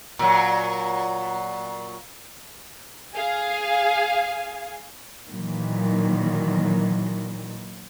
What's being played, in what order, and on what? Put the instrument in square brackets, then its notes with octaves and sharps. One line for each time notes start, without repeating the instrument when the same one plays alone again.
[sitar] A#2 F#3
[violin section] G#4 F5 G#5
[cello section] A#2 D#3 E3 F#3